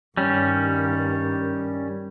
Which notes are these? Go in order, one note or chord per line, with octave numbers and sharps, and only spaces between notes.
G2 D#3 G3 C#4